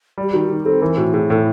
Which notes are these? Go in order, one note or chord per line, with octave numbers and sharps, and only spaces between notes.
G3
G4
D#3 F#4
D#3 G4
C4 A4
E3 A#4
A2 F#4
A2 G#4
A2 A4